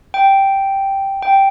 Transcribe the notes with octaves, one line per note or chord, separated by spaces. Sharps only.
G5
G5